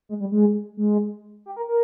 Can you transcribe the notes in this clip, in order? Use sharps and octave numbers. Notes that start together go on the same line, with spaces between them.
G#3
G3
G#3
G#3
G4
A#4
A#4